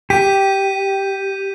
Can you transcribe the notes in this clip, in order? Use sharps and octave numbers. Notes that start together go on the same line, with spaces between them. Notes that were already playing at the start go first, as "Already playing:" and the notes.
G4 G6 B6 D#7